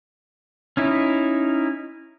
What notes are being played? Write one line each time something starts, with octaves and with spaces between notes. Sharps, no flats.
C#4 D#4 E4